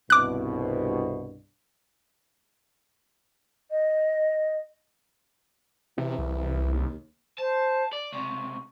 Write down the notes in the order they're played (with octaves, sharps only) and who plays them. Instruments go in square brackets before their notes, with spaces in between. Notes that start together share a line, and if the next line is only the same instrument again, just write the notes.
[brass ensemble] C2 G2 B2 [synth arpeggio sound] D6 F#6
[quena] D#5
[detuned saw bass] C3 [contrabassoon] E3
[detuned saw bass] C2
[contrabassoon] D#2
[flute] C5 [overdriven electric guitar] A5
[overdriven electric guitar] D5
[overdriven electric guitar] C#2 C3 [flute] C#6